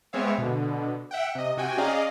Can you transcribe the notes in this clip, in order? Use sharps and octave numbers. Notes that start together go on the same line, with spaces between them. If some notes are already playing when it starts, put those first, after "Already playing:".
G#3 B3 C4 C#5 E5 F5
B2 D3
E5 F#5 G5
C3 D#5
C3 F#4 G5 G#5
C#4 G#4 D5 D#5 F5 A#5